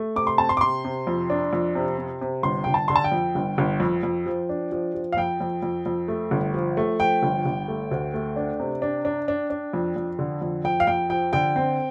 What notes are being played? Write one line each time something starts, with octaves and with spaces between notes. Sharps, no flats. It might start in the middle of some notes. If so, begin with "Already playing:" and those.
Already playing: A3
C3 D6
C6
C4 A5
C6
D6
C3 C6
C3
F2
D4
F2
C3
C3
C3
G1 C6
G1 G5
A5
D3 C6
A5
G5
F2
G1
G1
F2
F2
F3
D4
F3
F3
F5
F2 G5
F2
F2
F2
A3
G1
F3
A3
F3 G5
G1
G1
A3
D2
A3
D4
C3
D4
D4
D4
D4
F2
F2
D3
F2
F2 G5
F5
F2 G5
F3 G5
D3 G5
C4